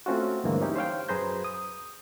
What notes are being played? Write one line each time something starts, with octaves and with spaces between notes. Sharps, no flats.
A3 C4 C#4 F4 F#4
D2 G2 E3 G#3 A#3 C4
C#4 D#4 E4 G4
C5 C#5 F5 G5
F#2 G#4 B4 C5 A#5 G6
D#6